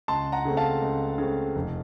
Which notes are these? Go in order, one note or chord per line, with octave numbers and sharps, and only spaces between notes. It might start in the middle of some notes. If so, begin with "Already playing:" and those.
C#2 A5 C6
F#5 A#5
C#3 A3 C4
F5 A5
C#2
C#3 A3 C4
F1